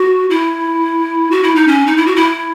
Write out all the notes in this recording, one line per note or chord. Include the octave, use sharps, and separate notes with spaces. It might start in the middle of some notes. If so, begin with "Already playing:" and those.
Already playing: F#4
E4
F#4
E4
D#4
C#4
D#4
E4
F#4
E4